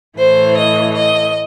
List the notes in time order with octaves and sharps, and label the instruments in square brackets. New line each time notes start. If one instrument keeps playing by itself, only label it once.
[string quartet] A2 E3 A3 C5
D#5
D#5